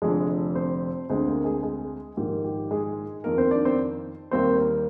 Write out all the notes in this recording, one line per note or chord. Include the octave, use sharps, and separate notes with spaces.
F1 F2 D3 G#3 G#4
C4 C5
D2 D3 G#3 C4 C5
A#3 A#4
G#3 G#4
G#3 G#4
A#1 G#2 D#3 A#3 G4
G4
G#3 G#4
F2 D#3 A#3 A#4
C4 C5
D4 D5
C4 C5
D#2 D#3 G3 A#3 C4 C5
A#3 A#4